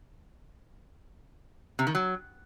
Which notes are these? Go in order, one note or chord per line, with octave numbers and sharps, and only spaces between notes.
C3
D#3
F#3